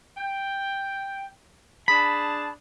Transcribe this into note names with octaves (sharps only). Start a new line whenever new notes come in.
G5
D4 G#4 A5 B5